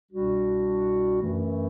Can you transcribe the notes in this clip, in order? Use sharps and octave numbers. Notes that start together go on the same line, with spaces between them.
C2 B2 G3 D4 F#4
F#2 E3 A3